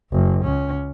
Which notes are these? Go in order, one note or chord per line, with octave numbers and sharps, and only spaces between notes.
F#1 F#2
C#2 C#4